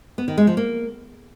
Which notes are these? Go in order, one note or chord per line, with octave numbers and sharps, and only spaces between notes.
B3
D#3
G#3
F3
A#3